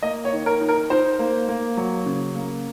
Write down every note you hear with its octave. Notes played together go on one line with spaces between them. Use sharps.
A#3 D#5
C#5
D#3
A#4
D#4
A#4
D#4 C5
A#3
A#3
F#3
C#3
A#3